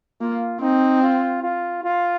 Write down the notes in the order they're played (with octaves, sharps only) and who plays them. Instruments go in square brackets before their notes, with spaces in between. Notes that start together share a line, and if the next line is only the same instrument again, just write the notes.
[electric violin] A#3 [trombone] F4
[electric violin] C4 [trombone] D#4
[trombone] F4
F4
F4